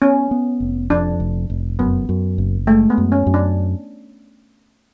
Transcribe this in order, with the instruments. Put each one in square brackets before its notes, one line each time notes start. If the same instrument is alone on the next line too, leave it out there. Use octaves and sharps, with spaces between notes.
[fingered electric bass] B3 [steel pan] C#4
[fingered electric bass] B3
F1
[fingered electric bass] F2 [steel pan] D4
[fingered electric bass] F1
F1
[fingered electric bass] F#2 [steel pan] B3
[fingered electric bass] F#2
F#1
[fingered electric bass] G#3 [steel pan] A3
[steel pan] B3
[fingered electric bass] F#2
[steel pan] C#4
[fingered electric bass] F#2
[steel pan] D4